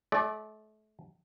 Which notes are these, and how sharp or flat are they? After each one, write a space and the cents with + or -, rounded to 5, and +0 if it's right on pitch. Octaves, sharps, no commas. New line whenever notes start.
A3 -35 D5 +0